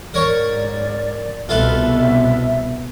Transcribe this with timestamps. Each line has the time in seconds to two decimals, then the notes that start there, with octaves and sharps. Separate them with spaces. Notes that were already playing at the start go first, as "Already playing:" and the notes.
0.14 G#2 A#4 C#5 D5 C#6
1.49 C2 B2 B3 F4 A4 B4 E5